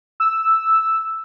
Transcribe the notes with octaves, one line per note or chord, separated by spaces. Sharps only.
E6